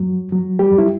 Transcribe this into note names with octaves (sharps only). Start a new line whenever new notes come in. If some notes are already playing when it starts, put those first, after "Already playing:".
Already playing: F#2 F#3
F#3
G3 G4
F#2
E4